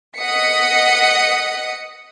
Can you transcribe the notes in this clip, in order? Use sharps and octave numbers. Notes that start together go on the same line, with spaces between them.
D#5 F#5 D#6 B6 C#7